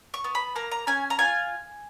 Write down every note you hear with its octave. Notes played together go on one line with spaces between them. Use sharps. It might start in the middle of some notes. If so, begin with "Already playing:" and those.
C#6
B3
B5
A#3 A#5
A#5
C#4 G#5
A#5
F4 G#5